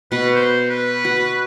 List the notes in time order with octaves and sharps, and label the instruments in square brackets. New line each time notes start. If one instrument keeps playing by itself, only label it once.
[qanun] B2 [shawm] B4
[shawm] C5
B4
[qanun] F#4